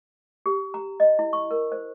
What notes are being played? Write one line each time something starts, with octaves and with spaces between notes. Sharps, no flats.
G4
A#5
D#5
E4
C#6
A#4
C5